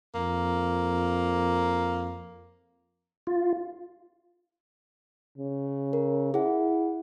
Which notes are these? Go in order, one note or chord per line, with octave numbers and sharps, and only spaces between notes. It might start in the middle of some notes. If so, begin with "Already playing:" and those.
F2 A#3
F4
C#3
A#4
E4 G#4 F#5